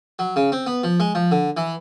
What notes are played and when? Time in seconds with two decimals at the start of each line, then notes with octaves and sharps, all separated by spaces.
0.19 F#3
0.36 C#3
0.52 C4
0.67 B3
0.84 F3
1.00 G#3
1.15 F3
1.32 D3
1.57 E3